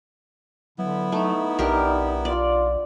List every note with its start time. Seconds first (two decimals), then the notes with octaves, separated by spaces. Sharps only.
0.78 D3 F#3 B3 E4
1.12 A3 D#4
1.59 B1 D4 G4 A#4
2.25 F4 D5